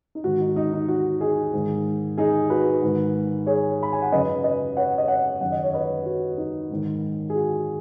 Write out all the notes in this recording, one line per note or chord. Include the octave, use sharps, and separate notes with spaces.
D#4
G#2 D#3 F#4
D#4
D#4
D#4
F#4
D#4 G#4
G#2 D#3
D#4 G#4
F#4 B4
G#2 D#3
G#4 C#5
B5
G#5
F#5
F#2 C#3 B4 D#5
B4 D#5
C#5 F#5
D#5
C#5 F#5
F#2 D#3 F#5
D#5
C#5
B4 D#5
F#4
D#4
G#2 D#3
G#4
F#4